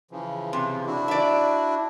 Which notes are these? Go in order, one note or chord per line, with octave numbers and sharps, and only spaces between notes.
C#3 E3 F3
C3
D4 E4 F#4
D5 E5